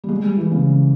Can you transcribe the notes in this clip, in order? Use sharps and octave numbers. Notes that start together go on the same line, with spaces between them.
G3
G#3
G3
E3
C#3